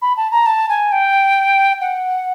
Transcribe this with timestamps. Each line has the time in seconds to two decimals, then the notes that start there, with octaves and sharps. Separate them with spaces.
0.02 B5
0.17 A5
0.31 A#5
0.46 A5
0.69 G#5
0.92 G5
1.81 F#5